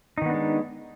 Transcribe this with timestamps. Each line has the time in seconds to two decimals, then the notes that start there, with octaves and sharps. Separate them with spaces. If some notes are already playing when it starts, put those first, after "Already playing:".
0.18 D#4
0.22 D#3
0.26 B3
0.30 D4
0.34 G#3